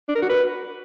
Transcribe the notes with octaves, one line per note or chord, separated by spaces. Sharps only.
D4
A#4
F#4
B4